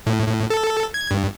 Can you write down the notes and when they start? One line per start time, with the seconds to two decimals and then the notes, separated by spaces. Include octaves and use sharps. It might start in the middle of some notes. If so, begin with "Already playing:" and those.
0.07 A2
0.27 A2
0.50 A4
0.94 G#6
1.11 G2